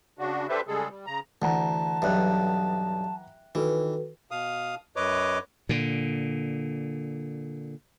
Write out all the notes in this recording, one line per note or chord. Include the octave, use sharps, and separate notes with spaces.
C#3 D4 F#4
D4 G4 A4 B4 C5 E5
C#3 G3 G#3 G#4 A4
G3
C#3 A#5
D2 E3 F#5 A5 A#5
B1 G2 E5 G5 F#6
D#3 E3 F#4 A4 B4
B2 F5 D#6
F#2 B4 C#5 D#5 D6
A#2 D3